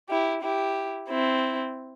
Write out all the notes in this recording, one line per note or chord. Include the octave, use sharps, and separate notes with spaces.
E4 G4
E4 G4
C4 E4